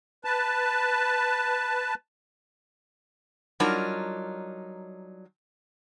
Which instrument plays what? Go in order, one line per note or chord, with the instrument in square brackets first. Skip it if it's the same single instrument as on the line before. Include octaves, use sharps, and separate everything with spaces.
[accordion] B4 A5
[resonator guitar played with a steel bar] F#3 G3 D4 D#4 F4 A#4